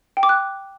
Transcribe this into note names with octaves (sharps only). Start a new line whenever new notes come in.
G5
D6
F#6